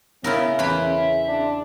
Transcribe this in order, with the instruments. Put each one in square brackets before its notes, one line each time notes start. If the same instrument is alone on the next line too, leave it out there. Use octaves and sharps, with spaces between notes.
[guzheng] C#3 E4 A#4 [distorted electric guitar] B3 [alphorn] C#4
[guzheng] E2 B4 B5 [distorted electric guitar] E5 C6
[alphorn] D4